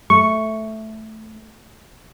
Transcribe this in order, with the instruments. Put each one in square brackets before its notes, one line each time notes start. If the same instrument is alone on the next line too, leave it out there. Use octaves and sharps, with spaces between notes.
[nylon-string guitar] A3 [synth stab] C#6